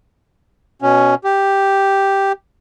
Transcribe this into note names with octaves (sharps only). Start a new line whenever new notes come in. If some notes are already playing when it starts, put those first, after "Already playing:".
B2 C#4
G4